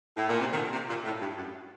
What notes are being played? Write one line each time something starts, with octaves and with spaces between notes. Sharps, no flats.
A2
A#2
C3
D#3
A#2 D3
C3
A#2
A2
G2
F#2